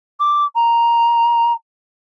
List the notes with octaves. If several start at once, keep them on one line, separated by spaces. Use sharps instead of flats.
D6
A#5